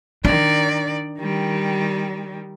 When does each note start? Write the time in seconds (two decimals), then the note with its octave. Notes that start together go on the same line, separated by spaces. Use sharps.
0.25 D#3 D4 D5
1.18 D#3 G3